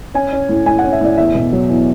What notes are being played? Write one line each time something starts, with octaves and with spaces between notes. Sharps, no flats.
C#4 G#5
C#4
A2
A2 G#5
F#5
C#4
E5
A2 D5
E2 E5
B2
F#3
E2